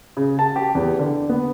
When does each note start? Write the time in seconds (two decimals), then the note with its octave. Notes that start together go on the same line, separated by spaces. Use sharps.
0.17 C#3
0.39 A5
0.56 G4
0.75 E2
0.99 D3
1.29 B3